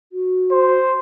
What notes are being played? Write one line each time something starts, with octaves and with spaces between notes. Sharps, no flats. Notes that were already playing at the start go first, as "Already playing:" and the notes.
F#4
C5